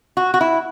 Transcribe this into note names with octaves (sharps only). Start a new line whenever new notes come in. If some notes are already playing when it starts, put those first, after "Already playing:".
F#4
F#4
E4